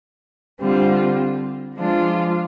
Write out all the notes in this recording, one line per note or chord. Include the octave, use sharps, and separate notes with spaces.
D3 G3 C4 F4
F3 G#3 D4 F4